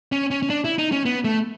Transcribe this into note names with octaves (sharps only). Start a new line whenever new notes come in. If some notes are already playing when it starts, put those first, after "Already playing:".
C#4
C#4
C#4
D4
E4
D#4
C#4
B3
A3